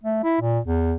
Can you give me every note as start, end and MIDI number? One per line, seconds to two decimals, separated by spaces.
0.03 0.19 57
0.24 0.40 64
0.41 0.59 46
0.65 0.94 40